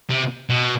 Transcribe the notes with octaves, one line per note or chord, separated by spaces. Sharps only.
C3
B2